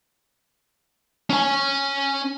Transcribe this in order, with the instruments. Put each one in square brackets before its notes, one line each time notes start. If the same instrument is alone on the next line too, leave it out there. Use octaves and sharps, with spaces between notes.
[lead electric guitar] C#4 G#5